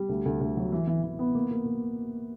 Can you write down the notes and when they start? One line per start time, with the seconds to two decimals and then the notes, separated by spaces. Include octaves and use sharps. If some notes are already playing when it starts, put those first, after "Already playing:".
Already playing: G3
0.09 D2
0.26 D2
0.41 D2
0.57 F#3
0.72 E3
0.87 E3
1.03 E3
1.19 B3
1.35 A#3
1.51 A#3
1.66 A#3